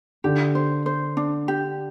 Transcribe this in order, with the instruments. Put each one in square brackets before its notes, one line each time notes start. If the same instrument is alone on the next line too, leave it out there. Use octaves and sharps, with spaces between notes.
[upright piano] D3 [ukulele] G4
[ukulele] C5
C5
D4
G4